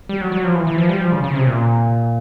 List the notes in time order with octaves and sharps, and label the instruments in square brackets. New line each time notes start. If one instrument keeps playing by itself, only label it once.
[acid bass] G3
F#3
F#3
F3
E3
E3
F3
G3
F3
C#3
C#3
C3
A#2